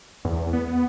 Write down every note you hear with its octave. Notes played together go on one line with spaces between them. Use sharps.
E2
B3